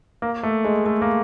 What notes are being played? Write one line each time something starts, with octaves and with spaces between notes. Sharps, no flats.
A#3
A3
G#3
A3
A#3